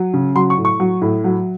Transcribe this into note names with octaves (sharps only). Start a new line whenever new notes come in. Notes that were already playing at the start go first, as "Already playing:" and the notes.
Already playing: F#3
C#3
F#3 C6
C#6
A2
C#6
F#3
A2
F#3